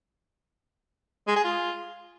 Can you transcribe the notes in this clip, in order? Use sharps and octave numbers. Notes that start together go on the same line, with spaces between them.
G#3
G#4
F4